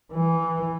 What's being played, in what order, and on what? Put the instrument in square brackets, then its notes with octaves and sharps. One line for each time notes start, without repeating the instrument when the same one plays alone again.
[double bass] E3